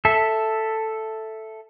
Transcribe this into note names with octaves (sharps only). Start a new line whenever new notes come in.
A4 E5